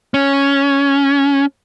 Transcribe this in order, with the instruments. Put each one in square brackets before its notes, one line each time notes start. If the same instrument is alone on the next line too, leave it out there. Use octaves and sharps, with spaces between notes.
[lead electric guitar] C#4